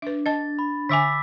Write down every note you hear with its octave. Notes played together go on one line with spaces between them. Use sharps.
D4 B4 E5
D#5 A5 A6
B5
D3 E5 G#5 D6 E6 B6